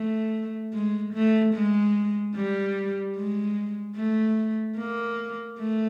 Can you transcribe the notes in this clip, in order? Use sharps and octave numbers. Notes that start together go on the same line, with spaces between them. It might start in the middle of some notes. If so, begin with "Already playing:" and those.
Already playing: A3
G#3
A3
G#3
G3
G#3
A3
A#3
A3